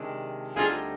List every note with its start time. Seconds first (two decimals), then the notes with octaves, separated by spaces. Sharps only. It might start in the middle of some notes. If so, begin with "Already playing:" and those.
Already playing: C3 D#3 G#3 D4
0.56 D2 D3 G3 C4 D#4 F4 G#4